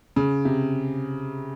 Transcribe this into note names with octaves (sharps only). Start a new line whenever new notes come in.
C#3
C3